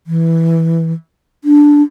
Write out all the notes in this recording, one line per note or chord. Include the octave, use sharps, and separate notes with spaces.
E3
D4